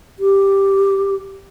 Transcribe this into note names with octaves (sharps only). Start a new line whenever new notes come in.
G4